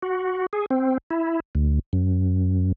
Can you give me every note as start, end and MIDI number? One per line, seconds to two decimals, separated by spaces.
0.03 0.46 66
0.53 0.66 68
0.70 0.98 60
1.11 1.40 64
1.55 1.79 38
1.93 2.72 42